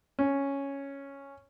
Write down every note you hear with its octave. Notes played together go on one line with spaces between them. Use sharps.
C#4